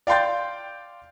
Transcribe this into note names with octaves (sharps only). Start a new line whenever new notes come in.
D5 F5 G5 C6 G6 A6